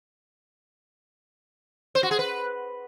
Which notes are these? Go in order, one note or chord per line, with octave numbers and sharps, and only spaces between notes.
C5
F#4
G#4
B4